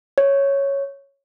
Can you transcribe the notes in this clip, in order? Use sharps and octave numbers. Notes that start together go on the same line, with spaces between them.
C#5